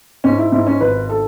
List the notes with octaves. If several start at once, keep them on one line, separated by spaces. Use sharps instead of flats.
G#2 C#4
E4
G#2 E4
C#4
G#1 B4
A4